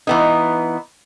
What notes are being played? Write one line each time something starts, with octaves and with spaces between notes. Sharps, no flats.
E3 B3 D#4